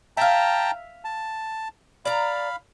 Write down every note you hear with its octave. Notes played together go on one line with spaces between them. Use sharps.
E5 F5 G5 A5 A#5
A5
D5 F5 A#5 B5